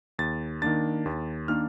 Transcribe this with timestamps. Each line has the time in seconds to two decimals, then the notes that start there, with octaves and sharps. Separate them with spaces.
0.19 D#2 A6
0.62 D#3 A#3 D4 A6
1.06 D#2
1.48 D#3 A#3 D4 F6